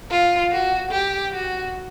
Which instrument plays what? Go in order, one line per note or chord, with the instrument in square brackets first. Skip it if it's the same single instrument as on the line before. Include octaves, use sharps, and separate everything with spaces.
[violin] F4
F#4
G4
F#4